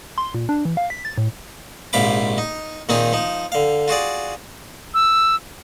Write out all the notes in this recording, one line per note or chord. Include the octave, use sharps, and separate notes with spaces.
C6
A#2
D4
E3
F5
B6
A6
A2
A#1 G#2 C3 F5 B5 D6
D#4
A#2 D#3 C4 D#4 F4 G#4
F3 D#4
D3 F5
F4 F#4 G#4 D5
E6